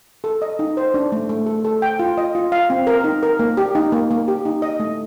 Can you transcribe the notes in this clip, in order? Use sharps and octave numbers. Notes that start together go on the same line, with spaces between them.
A4
D#5
D#4
C5
D4
A3
A3
A4
A4
G5
F4
D#5
F4
F5
C4
A#4
D#4
A#4
A#3
G4
D#4
A#3
A#3
G4
D#4
D#5
A3